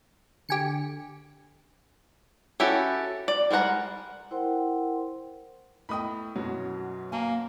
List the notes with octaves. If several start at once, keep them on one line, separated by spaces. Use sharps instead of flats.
D3 G4 G#5 C#7
C#4 E4 F#4 G4 A4
D5
G3 G#3 A#4 F#5 A#5
E4 A#4 C5 F#5 G5 C6
A3 B3 E4 D#5 G5 B5 D#6
F#2 B2 F#3
A#3 G#5 A5